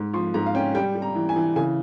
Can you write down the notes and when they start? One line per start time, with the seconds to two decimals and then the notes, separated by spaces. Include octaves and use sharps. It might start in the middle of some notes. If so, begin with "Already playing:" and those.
Already playing: G#2
0.13 F3 C6
0.34 G#2 A#5
0.46 F5
0.55 C#4 G5
0.75 G3 G5
0.95 G3
1.02 A#5
1.15 E3
1.29 G#5
1.36 E3
1.56 C#3 G#5